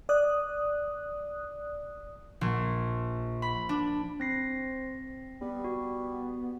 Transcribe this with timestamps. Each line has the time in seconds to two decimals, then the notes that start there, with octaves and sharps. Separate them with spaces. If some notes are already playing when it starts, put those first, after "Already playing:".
0.09 D5 D#6 F#6
2.41 A#1
3.42 B5
3.69 D4
4.20 C4 C5 A#6 C7
5.41 G3 B3
5.64 F#4